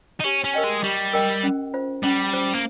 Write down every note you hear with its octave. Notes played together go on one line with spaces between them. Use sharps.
D#4
C#4 G4
C#4
A#4 D#5 G5
G#3
G3 G4
A#4 D#5 G5
C#4
F4 C5
G3 C#4
F4 C5
A#3